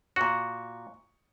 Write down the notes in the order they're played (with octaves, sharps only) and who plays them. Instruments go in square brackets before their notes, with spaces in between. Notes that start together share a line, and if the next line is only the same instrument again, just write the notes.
[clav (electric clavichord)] A#2 F#4 [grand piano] C#6